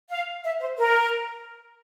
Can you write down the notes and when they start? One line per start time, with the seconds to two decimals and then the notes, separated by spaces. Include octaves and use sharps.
0.10 F5
0.43 E5
0.60 C5
0.77 A#4